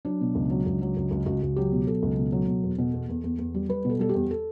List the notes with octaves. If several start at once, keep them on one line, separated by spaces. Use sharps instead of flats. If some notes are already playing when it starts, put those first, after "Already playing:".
F#3 D4
B2
C#2
F#3
C#2
F#3
C#2
C#2
C#2 F#4
C#2
F#3 G4
B2
F#3 A4
C#2
B2
F#3
B2
E2
B2
E2
E2
E2
E2
G3
G3 B4
B2 A4
G3 A4
G4
E2
A4